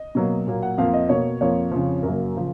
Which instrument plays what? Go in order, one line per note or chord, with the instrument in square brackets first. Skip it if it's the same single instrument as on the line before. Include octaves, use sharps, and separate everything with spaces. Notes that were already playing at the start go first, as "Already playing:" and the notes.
Already playing: [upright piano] D#5
B2 F#3 A#3
A#2 F#3 A#3
F#5
F2 F3 A#3 F5
D#5
B2 A#3 C#5
F2 F3 A#3 C#5
F2 C#3 F3
F#2 C#3 F#3 A#3 A#4
C#3 F3